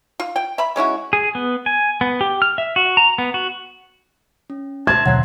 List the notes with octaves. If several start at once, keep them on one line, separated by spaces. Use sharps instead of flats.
F4
G5
E5 B5
G#3 C#4 E4 F#4
G#4
B3
G#5
B3
G4
F6
E5
F#4
A#5
B3
F#4
C#4
C5 E5 A5 C6 G#6
D#2 B2 D3 F#3 F5 F#5